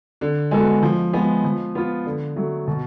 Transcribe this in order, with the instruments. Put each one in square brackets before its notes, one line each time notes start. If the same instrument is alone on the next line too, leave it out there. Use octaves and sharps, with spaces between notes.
[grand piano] D3
G#3 B3 F#4 A4
F3
G#3 B3
F3
B3 F4
D3
F#3 A3
B2